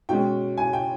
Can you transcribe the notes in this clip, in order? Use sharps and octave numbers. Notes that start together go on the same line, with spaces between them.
B2 G#3 C#4 G5
G#5
G5